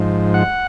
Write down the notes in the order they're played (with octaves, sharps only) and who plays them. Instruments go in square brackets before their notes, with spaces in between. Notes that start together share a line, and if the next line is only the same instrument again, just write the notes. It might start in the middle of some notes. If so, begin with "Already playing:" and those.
Already playing: [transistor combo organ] G#2 F3
F#5